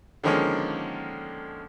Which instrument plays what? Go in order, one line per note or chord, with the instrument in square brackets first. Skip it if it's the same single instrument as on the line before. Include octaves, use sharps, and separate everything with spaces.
[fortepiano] D3 D#3 F3 G#3 A#3 C#4